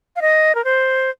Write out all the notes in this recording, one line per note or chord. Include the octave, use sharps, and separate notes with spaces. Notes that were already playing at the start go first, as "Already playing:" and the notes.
F5
D#5
A#4
C5